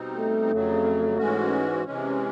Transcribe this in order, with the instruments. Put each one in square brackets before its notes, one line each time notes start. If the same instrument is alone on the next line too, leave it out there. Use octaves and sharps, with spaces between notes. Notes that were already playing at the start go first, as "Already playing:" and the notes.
Already playing: [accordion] B2 G3 C4 D#4
[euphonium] A3
[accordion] F2 C#3 F#3
G#2 E3 G#3 C#4 F#4
C3 E3 G#3 C#4